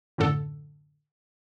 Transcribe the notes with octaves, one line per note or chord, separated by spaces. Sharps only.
F#2 A2 D3 A4